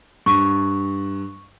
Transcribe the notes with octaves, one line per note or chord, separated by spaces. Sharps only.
G2 C#6